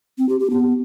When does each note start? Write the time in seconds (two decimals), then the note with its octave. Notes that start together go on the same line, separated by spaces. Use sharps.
0.18 C4
0.29 G4
0.40 G4
0.50 B3